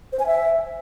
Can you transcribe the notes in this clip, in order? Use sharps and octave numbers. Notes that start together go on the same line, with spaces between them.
C5
G#5
E5